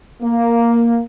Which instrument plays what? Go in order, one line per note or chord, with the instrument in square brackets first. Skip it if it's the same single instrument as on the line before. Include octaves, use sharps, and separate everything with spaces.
[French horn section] A#3